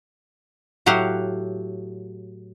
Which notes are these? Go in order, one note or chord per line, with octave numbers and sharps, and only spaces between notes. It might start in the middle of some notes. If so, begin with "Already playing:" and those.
A2 F#3 G4 F5 F#5